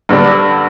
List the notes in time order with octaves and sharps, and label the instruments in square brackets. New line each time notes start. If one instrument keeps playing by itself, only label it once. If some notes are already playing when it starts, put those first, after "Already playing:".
[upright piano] G2 D3 G3 D4